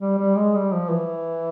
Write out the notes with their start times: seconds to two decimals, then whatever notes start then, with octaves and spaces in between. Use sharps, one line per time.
0.01 G3
0.19 G3
0.37 G#3
0.55 G3
0.73 F3
0.91 E3